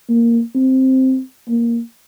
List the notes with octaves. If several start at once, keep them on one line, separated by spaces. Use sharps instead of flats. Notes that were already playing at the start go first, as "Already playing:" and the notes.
A#3
C4
A#3